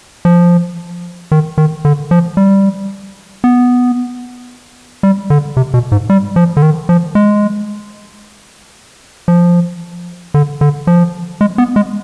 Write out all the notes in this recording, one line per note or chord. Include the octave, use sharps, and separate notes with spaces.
F3
D#3
D#3
D3
F3
G3
B3
G3
D3
C3
B2
G#2
G3
F3
D3
D#3
F3
G#3
F3
D3
D3
F3
G#3
B3
G#3